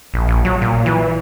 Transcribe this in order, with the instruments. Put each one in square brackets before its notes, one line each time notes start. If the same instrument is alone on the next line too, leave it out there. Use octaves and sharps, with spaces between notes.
[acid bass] A#1
A#1
F#3
A#2
E3